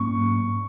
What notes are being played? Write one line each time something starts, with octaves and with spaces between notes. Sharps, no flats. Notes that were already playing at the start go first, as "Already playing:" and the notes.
Already playing: G#2 F#3 A#3 C#4 C#6